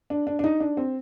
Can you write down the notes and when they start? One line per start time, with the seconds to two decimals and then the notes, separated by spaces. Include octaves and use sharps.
0.10 D4
0.27 D4
0.39 D4
0.44 D#4
0.60 D4
0.77 C4